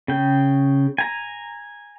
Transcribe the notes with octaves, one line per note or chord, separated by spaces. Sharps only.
C#3 G5
G#5 A#5